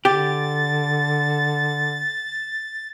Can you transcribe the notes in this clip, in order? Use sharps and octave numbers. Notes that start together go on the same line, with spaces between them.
D3 G4 A6